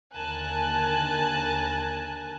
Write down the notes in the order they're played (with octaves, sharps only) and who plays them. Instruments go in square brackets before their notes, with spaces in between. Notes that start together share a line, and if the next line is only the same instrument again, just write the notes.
[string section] D#2 D3 A#4 G#5 A5 F#6